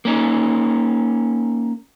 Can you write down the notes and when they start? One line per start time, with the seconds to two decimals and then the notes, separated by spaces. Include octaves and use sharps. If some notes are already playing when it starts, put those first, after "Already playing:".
0.05 A#3 C#4 D#4